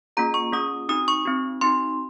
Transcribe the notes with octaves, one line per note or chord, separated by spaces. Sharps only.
A#3 C#4 F4 G#4 A#5
C#6
A#3 C#4 F4 G#4 D#6
C4 D#4 F#4 D#6
C#6
C4 D#4 F#4
C4 D#4 F#4 C6